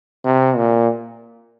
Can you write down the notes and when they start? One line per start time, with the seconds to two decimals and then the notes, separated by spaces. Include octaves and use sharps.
0.25 C3
0.56 A#2